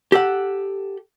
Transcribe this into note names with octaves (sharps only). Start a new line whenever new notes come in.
G4 A4 F#5